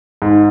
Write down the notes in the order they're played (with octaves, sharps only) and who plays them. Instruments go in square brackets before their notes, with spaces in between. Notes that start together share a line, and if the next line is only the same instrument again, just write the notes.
[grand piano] G#2